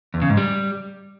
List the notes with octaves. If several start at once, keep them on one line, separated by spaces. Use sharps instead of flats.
E2
C#3
G#2
G3